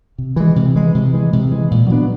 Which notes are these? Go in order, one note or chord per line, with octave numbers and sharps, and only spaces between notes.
C3
E3 G#3
C3
E3 G#3
C3
E3 G#3
C3
E3 G#3
A#2
F#3 B3 D4